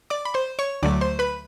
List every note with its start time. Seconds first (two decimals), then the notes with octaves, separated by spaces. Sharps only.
0.10 D5 D6
0.25 B5
0.34 C5 C6
0.59 C#5 C#6
0.83 D2 D3 F#3 A3 D5 D6
1.01 C5 C6
1.19 B4 B5